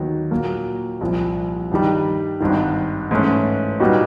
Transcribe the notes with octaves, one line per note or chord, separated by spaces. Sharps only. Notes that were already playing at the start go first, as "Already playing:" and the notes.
Already playing: D#2 D#3 F#3 B3
A#2 F#3 A#3
C2 A#2 F3
G2 D#3 G3
G#1 G2 D#3
G#2 E3 A3 C#4
A#2 G3 B3 D#4 F#4